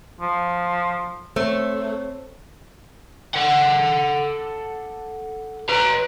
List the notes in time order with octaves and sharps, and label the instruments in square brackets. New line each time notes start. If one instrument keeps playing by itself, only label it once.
[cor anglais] F3
[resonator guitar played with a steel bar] A3 [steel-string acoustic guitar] C4 C5 C#5
[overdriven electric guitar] A4 F#5
B4 A#5